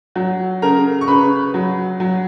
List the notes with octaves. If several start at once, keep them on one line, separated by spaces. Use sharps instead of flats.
F#3
C#3 A#4 A#5
C#6
C#3 B4 B5
F#3
F#3